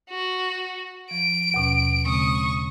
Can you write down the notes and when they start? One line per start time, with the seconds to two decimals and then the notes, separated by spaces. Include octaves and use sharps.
0.10 F#4
1.11 F3 D7
1.54 D#2 B2 C#4
2.05 C#3 G#3 C4 C#6 D#6